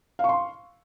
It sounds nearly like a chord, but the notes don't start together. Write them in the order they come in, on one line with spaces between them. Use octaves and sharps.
F5 C#6 C6